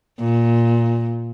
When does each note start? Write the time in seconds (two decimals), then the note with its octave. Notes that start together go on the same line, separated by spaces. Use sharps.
0.20 A#2